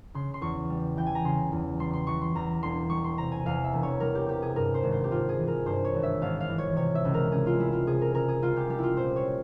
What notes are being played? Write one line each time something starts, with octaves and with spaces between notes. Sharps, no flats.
C#3 C6
C6
E2 C#6
G3
E3 G5
G#5
A#5
C#3 C6
E2
G3 C6
C6
E3 C#6
C6
E2 A#5
E1 C6
G3 C#6
C6
C3 A#5
G#5
E2 F5
E5
E1
C#5
G3 A#4
G4
C3 G4
G#4
G2 A#4
C5
G#1
C5
G4
G#1 F4
G#4
E3
A#4
G2 C5
C#5
G#1
E5
G#1 F5
F5
E3
C#5
C3 C#5
E5
C#2
A#4
C#2 G#4
F4
G3 E4
F4
C3 G#4
A#4
C#2 A#4
G#4
C#2 F4
G4
G3 G4
E4 F4
A#2 C5
C#5